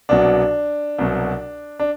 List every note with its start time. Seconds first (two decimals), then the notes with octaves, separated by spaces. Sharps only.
0.09 C2 B2 F#3 D4
0.98 C2 B2 F#3
1.80 D4